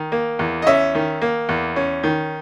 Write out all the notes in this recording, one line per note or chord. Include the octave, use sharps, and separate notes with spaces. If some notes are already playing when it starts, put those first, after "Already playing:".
Already playing: D#3
A#3
E2
D#5
C#4 E5
D#3
A#3
E2
C#4
D#3